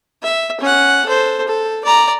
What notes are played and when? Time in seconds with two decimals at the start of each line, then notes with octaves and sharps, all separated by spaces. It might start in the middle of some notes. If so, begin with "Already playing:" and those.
0.23 E5
0.61 C#4 F#5
1.05 A4 C5
1.48 A4
1.85 D5 A#5